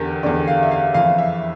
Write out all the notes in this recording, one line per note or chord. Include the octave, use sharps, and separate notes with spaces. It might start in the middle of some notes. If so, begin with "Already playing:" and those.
Already playing: E2 D3 G4 A#4
E2 D3 D5
F5
E5
F5
F2 E3 F5
E5